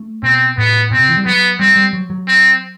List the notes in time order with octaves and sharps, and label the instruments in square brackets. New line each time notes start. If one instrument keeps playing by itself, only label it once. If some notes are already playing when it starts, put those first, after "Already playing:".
Already playing: [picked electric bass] A3
[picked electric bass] B2 [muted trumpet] C4
[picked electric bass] A2 [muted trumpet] B3
[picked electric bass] B2 [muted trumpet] C4
[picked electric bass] C3
E3
G3
[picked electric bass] F#3 [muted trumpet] B3
[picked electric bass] G3 [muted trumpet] C4
[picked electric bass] G3
F#3
F#3
[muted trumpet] C4